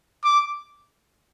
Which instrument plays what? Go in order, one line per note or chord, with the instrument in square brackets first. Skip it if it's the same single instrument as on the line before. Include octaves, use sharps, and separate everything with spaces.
[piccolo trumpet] D6